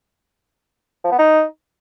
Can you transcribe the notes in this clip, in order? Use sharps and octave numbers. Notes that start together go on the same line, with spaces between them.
F3
B3
D#4